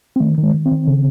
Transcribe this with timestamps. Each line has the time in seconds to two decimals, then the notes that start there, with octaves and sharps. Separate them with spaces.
0.16 C4
0.20 D#3 A3
0.38 D#3
0.43 G#3
0.54 D#3
0.65 C4
0.71 D#3
0.87 C#3